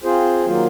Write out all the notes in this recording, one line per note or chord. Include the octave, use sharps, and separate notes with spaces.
C4 F4 G#4 C5
D#3 F#3 A#3 F4